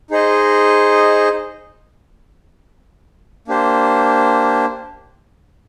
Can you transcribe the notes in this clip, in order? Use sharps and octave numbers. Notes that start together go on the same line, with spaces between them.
D#4 G#4 C5 D#5
A#3 D4 G4 C5